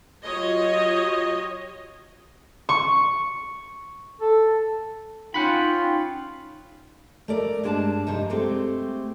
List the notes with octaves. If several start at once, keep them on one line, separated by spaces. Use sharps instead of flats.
F#3 F4 G4 C#5 D#5
C#6
A4
C#4 D#4 F4 F#5 G5 B5
A3 A#4 D5
G2 G#3 D4 G#5 A5
G2 C3 D#4
G#3 A3 C4 G4